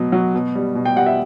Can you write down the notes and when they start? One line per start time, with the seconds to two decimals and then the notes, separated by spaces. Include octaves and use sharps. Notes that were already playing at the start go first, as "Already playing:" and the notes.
Already playing: B2 F#3
0.12 F#3
0.34 B2
0.55 G3
0.75 B2
0.85 G5
0.96 G3 F#5
1.06 E5